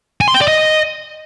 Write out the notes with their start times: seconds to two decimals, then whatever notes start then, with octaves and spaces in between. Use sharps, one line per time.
0.21 G#5
0.28 C6
0.34 G5
0.41 D5
0.48 D#5